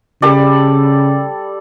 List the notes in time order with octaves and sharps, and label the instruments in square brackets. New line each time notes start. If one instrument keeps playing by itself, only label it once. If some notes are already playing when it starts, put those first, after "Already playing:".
[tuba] C#3 [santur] G3 A4 D5